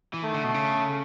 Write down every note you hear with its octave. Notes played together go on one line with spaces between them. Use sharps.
E3
D#3 A3
D3
B2
C#3